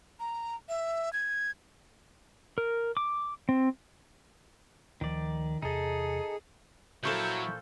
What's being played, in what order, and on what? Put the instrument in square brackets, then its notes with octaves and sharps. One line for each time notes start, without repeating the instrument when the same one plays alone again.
[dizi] A#5
E5
G#6
[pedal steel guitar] A#4
D6
C4
[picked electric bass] D2 F3 [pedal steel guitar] D#3 D5
[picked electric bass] E2 C3 [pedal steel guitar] D#4 A4 [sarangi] G#4
[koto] A#2 F3 A4 [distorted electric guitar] F#3 [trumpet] E4 [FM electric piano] C#6 G6